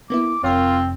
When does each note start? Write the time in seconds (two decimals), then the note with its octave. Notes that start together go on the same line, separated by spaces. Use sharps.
0.10 A#3 B3 E4 D6
0.43 F1 C4 F4 A#4 C#5